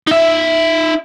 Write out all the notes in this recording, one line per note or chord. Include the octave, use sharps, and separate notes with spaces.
D#4 E5